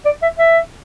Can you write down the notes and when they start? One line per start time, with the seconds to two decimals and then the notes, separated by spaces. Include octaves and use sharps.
0.05 D5
0.23 E5
0.39 E5